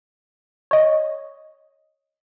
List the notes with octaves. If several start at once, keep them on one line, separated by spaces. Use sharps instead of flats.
C#5 D#5